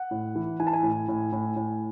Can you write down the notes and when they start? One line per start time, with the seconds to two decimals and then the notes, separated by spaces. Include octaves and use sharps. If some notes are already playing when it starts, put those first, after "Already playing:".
Already playing: F#5
0.11 A2
0.36 E3
0.60 E3 G#5
0.67 A5
0.73 G#5
0.83 A2
1.08 A2
1.32 A2
1.56 A2